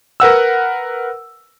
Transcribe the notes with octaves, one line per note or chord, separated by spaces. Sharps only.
A#4 B4 F#5 E6